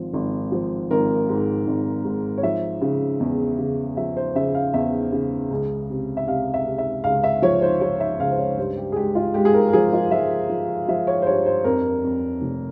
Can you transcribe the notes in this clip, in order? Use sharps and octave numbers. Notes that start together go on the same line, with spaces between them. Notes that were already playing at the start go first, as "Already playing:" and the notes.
Already playing: G#1 F3
G#1
F3
G#1 A#4
G#2
G#1
G#2
C#5
F3 E5
C#3
E2
C#3
F3 E5
C5
C#3 E5
F5
E2 E5
C#3
C#2
C3
E5
C3 F5
E5
C3
E5
C#2 F5
E5
F3 C#5
C5
F3 C#5
E5
C#2 F5
C5
C#5
G2 C5
G4
G#4
G#3 G4
F4
G#3 G4
G#4
A#4
A#4
F3 G#4
F4
F3 E5
F3
F3 E5
C#5
C5
G2 C#5
C5
F2 A#4
F2
F1